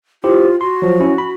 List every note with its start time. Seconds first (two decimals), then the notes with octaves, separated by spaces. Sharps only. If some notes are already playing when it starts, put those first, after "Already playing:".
0.24 E4 F4 G4 C5
0.61 F#4 C6
0.82 F3 F#3
1.00 C#4 E4
1.18 B5